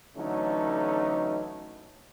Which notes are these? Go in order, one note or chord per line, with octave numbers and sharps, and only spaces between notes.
D3 E3 F#3 A3 C#4 D#4